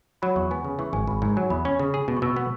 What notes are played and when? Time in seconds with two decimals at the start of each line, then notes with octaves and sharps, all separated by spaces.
0.22 F#3 B5
0.36 E2 C#6
0.51 B3 G#5
0.64 C#3
0.70 G#5
0.79 E3 C#6
0.93 G#1 G#5
1.07 G#1 B5
1.22 G#2 G#5
1.36 F#3 G#5
1.50 E2 B5
1.65 C#4 C#6
1.79 C#3
1.94 G#4
2.08 B2
2.17 C#6
2.22 B2 E6
2.37 B3